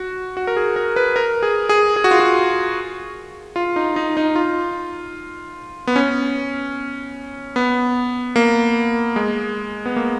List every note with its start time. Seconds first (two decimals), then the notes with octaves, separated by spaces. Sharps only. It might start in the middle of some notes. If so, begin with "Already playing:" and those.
Already playing: F#4
0.37 F#4
0.47 A#4
0.57 G#4
0.76 A#4
0.96 B4
1.16 A#4
1.43 G#4
1.69 G#4
1.96 G#4
2.04 F#4
2.11 F4
2.20 F#4
3.56 F4
3.76 D#4
3.96 D#4
4.17 D#4
4.36 F4
5.87 B3
5.96 C#4
7.56 B3
8.36 A#3
9.16 G#3
9.86 B3
9.96 A#3